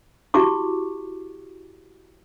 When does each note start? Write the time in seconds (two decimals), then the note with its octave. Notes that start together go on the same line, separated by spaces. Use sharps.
0.34 E4 F#4 G4 C#6 D6